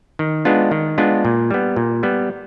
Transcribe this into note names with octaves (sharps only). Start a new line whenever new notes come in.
D#3
G#3 B3 D4 F4
D#3
G#3 B3 D4 F4
A#2
G3 B3
A#2
G3 B3